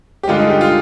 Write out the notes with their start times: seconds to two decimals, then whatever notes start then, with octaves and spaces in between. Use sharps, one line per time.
0.23 G4
0.28 G2 D3 G#3 F4
0.39 D#4
0.50 G4
0.61 F4